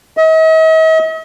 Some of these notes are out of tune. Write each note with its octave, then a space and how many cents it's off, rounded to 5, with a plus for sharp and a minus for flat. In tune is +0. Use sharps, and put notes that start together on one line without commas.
D#5 +45